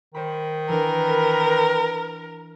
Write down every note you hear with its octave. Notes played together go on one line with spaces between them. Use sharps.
D#3 C5 B5
E3 D4 A#4 B4